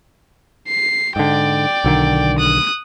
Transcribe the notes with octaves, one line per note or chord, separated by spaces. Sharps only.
C7
G#2 D3 D5 G5
B1 D3 D#3
D#6 F#6